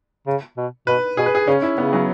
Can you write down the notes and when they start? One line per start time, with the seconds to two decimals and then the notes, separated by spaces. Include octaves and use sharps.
0.27 C#3
0.57 B2
0.87 B2 B4
1.17 B2 G#4
1.26 B4
1.35 G#4
1.47 C#3 C#4
1.62 E4
1.77 C#3 B3
1.93 F#3